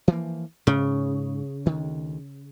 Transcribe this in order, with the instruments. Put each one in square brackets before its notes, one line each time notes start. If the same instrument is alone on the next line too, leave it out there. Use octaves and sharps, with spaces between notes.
[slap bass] E3 F3 A#3
[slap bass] G#2 [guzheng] C#3
[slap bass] D2 D#3